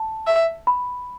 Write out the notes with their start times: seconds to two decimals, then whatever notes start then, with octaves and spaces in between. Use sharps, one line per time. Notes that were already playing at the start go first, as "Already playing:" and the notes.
Already playing: A5
0.27 E5
0.67 B5